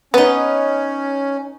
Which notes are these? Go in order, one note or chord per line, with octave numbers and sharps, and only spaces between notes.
B3 C#4 D#4 B4